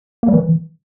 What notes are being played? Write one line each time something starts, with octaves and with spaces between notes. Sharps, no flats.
A#3
G3
E3